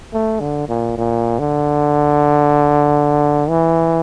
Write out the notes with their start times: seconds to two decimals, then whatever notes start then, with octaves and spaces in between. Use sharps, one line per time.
0.13 A3
0.40 D3
0.69 A#2
0.97 A#2
1.39 D3
3.49 E3